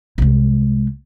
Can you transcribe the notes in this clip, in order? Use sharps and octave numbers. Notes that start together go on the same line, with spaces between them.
C2 G#3